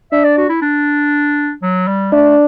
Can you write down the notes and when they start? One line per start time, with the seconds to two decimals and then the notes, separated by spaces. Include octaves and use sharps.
0.12 D4 E5
0.24 D5
0.38 F#4
0.49 E4
0.62 D4
1.62 F#3
1.87 G3
2.13 A3 D4